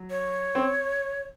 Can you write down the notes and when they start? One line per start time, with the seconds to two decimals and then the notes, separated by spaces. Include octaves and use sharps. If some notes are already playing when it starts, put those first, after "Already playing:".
Already playing: F#3
0.10 C#5
0.55 C4